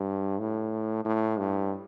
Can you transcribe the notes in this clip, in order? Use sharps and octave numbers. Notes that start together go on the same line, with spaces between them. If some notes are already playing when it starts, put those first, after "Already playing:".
Already playing: G2
A2
A2
G2